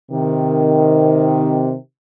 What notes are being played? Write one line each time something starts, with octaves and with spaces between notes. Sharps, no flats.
C3 D#3